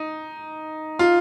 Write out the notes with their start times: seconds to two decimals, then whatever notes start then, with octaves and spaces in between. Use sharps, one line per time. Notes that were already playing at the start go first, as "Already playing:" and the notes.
Already playing: D#4
0.99 F4